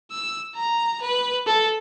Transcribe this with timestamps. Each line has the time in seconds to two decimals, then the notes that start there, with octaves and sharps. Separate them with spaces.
0.11 E6
0.55 A#5
1.01 B4
1.46 A4